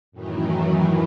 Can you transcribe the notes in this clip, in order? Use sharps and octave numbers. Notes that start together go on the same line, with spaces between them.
F#2 A2 D#3 E3 F#3